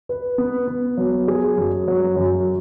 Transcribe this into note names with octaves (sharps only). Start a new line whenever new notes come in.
B4
B3
B3
F#3
G#4
F#2
F#3
F#2